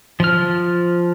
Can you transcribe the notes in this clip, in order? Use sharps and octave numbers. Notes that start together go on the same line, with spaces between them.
F3 F6